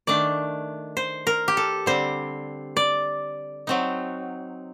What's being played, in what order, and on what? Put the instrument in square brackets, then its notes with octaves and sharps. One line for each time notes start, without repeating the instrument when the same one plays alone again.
[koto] D#3 A3 D4 D5
C5
A#4
G4
A4
D3 G3 C4 C5
D5
F#3 C4 D#4